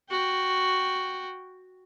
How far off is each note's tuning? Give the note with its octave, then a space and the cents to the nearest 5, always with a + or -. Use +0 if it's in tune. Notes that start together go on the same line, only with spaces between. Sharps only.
F#4 +0 G5 +0